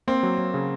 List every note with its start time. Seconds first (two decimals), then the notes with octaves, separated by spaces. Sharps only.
0.07 A#3 C4
0.23 F#3
0.38 F#3
0.54 C#3